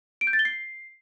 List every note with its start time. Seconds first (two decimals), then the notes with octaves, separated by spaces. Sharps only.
0.21 D7
0.27 G6
0.33 A6
0.39 G7
0.45 C7